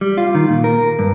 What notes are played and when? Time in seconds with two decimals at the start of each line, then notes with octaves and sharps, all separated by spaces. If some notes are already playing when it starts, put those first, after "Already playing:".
0.01 G3
0.17 F4
0.35 D#3
0.49 A#2
0.64 A#4
0.99 G2